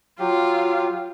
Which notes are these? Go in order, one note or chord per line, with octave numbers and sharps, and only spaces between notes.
F#3 F4 G4